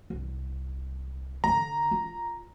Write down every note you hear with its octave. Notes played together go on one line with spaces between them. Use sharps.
C2
D3 D4 A#5
F4